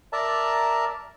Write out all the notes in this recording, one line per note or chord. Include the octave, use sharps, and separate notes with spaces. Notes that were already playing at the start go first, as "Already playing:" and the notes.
A#4 D5 E5 A5 A#5